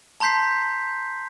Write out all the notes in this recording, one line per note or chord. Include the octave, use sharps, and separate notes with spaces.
A5 A#5 C6 G6 B6 C7